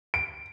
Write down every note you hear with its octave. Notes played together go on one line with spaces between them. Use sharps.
D7